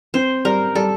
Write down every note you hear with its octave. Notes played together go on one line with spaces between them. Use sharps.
C4 C5
G3 A#4
G3 A4